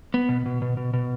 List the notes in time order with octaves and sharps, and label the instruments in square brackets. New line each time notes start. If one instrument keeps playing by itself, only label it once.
[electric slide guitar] B3
B2
B2
B2
B2
B2